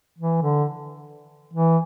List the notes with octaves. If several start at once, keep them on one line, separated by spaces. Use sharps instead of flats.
E3
D3
E3